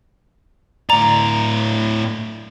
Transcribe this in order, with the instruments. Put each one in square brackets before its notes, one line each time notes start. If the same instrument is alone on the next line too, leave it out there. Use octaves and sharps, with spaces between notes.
[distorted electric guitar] A2 D5 [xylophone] A#5